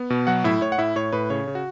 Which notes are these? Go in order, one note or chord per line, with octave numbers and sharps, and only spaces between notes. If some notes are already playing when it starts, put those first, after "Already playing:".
Already playing: B3
B2
F#3 F#4 F#5
A2 E4 E5
A2 C#5
F#5
A2 E4 E5
A2 C#5
A2 B4
C#3 C#5
C#3
F#4